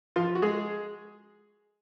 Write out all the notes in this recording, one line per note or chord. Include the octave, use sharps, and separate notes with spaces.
F3 F4
F#4
G#3 G#4